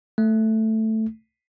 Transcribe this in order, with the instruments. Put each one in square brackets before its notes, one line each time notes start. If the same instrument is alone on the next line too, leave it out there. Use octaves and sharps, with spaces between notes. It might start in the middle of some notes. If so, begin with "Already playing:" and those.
[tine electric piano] A3